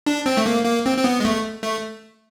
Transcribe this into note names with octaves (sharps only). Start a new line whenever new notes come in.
D4
C4
A3
A#3
A#3
C4
C4
B3
G#3
A3
A3